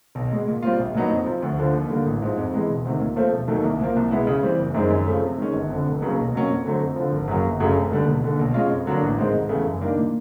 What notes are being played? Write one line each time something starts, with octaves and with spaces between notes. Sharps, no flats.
B1
B2 G#3
A#2
G3 C4 F4
A#1
A#2 F#3 B3 D#4
F2
C3 F3
D2
D3 F3
D#2
D3 G3 A#3
A1
G#2 F3
F2
C3 E3 G#3 B3
E1
D2 C3 D#3
A#2
F3 A3 C4 F4
E1
D#2 D#3 F#3 A3
C2
A#2 F3 A#3
C2
B2 G#3 B3 E4
C#3
E3 G3 C4
F#1
F#2 D#3 G#3 C4
F#2
C#3 F3 A3
C3
D#3 G#3 C#4
G1
F2 D3
F1
D#2 C#3 F#3 B3
B1
B2 F#3 A#3 C#4
F2
D3 F#3 A3 C4
F2
D3 F3
G#1
F#2 C#3 F#3 A#3
G1
F#2 C#3 F#3 A3
F1
D#2 D3 G3
E1
D#2 D3
B1
B2 G#3 C#4 F4
F2
D3 F#3 A#3 D4
A1
G#2 D#3 G#3 C4
F1
E2 C#3 E3 A3
F#2
D#3 G3 A#3 D4
A#2